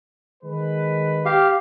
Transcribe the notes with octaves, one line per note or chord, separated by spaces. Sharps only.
D#3 G#3 B4
G4 F5